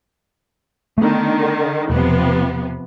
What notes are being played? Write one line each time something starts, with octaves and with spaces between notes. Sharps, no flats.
D3 D#3 A3 B3
E1 C3 F3 B3